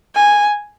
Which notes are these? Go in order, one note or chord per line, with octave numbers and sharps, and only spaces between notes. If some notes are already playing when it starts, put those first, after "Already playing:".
G#5